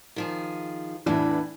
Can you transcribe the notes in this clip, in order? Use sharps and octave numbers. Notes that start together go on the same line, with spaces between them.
D#3 F3 G#4
E2 A2 E3 D4 B4